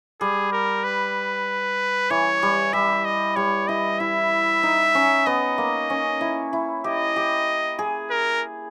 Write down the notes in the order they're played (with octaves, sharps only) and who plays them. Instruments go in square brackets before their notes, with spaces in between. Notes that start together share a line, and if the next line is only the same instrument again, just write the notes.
[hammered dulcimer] G3 [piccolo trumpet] G#4
[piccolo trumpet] A#4
B4
[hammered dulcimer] E3 [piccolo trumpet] C#5
[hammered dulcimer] G3
[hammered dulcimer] G3 [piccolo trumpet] E5
[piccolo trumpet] D#5
[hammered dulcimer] G3 [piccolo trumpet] C#5
[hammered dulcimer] E4 [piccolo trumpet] D#5
[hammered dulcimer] E4 [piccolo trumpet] E5
[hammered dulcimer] D#4
C#4
[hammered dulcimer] B3 [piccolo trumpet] D#5
[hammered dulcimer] A#3
C#4
E4
E4
[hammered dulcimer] G4 [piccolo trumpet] D#5
[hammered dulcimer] G4
G#4
[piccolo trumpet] A#4